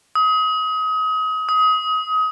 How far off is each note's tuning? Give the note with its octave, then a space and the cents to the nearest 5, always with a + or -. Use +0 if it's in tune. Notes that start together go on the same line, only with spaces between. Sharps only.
D#6 +30
D#6 +25